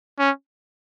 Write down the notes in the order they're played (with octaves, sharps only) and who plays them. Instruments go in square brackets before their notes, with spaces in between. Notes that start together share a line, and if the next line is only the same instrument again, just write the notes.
[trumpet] C#4